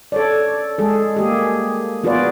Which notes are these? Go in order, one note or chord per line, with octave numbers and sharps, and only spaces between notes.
A4 C#5 D5
G#3 G#4 A4
A#3 G4 G#4
B3 F4 F#4 G#4 B4 D5